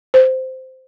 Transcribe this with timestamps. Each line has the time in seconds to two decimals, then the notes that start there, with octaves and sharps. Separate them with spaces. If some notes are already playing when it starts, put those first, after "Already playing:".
0.14 C5